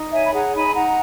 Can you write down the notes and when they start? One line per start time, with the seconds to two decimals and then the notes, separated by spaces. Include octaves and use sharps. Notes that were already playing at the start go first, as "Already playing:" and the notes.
Already playing: D#4
0.12 C#5 E5 G#5
0.24 B5
0.33 G#4 F#5 A#5
0.54 D#4 G#5 B5
0.75 D#4 F#5 A#5